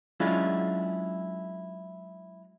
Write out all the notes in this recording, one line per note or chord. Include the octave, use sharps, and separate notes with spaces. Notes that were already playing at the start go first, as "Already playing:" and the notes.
F#3 G#3 C#4 D4 E4 F4